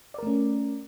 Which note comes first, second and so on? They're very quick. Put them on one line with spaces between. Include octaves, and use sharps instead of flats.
D5 A#4 A3 C#4